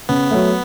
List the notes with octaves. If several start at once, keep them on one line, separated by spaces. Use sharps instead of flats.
C#3 B3
F#3 A3